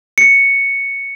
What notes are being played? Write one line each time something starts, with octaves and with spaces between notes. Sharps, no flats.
C#7